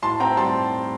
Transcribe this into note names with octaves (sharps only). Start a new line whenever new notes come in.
A2 A5 C6
C4 G5 A#5
G3 A5 C6